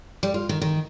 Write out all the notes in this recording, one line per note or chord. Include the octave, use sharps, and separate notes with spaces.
G3
F4
D#3
D#3